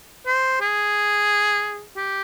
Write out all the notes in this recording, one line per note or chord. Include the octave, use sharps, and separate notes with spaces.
C5
G#4
G4